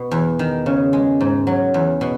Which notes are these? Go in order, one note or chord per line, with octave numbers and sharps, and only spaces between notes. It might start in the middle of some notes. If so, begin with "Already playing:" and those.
Already playing: B2
E2
D#3
C#3
G#3
G#2
F#3
E2
B2